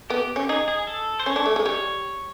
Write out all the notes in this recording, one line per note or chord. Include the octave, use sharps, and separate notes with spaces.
B3 G4
C#4
D#4 G#4
G#4
A4
C5
C#4 C#5
D4
A3
G#3
G3 C#5